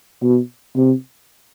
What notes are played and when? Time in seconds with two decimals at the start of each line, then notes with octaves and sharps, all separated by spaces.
0.22 B2
0.76 C3